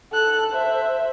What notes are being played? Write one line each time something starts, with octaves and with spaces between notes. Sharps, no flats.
A4 F#6
C5 E5